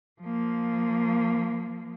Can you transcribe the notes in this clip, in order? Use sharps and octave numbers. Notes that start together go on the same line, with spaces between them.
F3 A#3